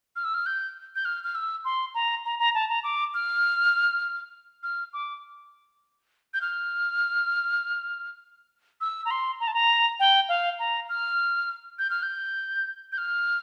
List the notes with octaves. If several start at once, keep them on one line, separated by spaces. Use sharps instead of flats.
F6
E6
F6
G6
G6
F6
F6
E6
C6
A#5
A#5
A#5
A5
A#5
D6
F6
F6
D6
G6
F6
E6
A#5
C6
A#5
A5
A#5
G5
F5
A#5
F6
G6
F6
G6
G6
F6